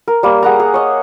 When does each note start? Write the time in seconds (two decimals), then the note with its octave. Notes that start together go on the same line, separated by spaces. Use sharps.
0.08 A#4
0.23 G3 A#3
0.43 G#4 F#5 A#5
0.60 G#4
0.74 C#5 D#5